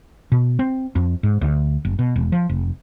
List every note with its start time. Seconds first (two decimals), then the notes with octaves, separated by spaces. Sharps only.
0.32 B2
0.59 C4
0.95 F2
1.23 G#2
1.41 D2
1.85 F#1
1.99 B2
2.16 E1
2.32 F3
2.49 F1